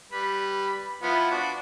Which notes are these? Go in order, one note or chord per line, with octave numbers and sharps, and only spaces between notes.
G3 B4
F3 B3 E4
D4 F#4